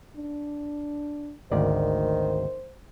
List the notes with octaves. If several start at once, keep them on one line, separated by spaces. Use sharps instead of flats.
D4
G#1 D2 D#3 C5 D5